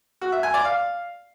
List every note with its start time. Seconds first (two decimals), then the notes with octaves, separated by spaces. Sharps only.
0.21 F#4
0.32 E5
0.43 G#5
0.54 D5
0.65 F5